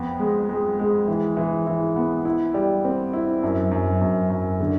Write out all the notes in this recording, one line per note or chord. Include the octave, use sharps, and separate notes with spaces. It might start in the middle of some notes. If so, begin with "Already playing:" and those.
Already playing: F2 B3
G#3
G#3
G#3
E3
E3
E3
B3
E4
G3
C4
E4
F#2
F#2
F#2
F#2
D3